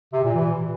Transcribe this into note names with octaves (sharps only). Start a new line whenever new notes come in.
C3
A#2
E3